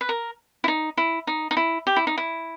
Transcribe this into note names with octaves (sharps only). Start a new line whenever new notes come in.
B4
A#4
E4
D#4
E4
D#4
D#4
E4
G4
E4
D#4
E4